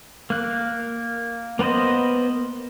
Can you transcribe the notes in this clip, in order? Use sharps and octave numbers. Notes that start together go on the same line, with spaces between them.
A#3 F#6
A#3 B3 B4 C5 D#5